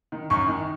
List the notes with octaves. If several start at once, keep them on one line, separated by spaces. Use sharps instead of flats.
D#3
F#2 C#6
D#3